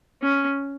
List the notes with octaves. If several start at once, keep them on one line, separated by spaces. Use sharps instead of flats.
C#4